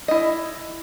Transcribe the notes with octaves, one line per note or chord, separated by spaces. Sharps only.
E4 D#5